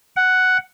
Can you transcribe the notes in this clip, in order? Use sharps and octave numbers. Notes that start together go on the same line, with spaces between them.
F#5